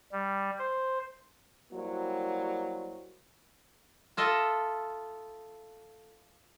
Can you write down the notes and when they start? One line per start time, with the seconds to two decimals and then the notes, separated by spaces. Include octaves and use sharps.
0.12 G3
0.59 C5
1.72 F#3 G3 A#3 E4 F#4 C5
4.17 F4 A4 D#5 E5